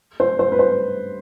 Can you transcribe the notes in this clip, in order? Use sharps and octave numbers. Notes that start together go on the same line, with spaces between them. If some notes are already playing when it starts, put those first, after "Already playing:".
C5
C5
B4
C5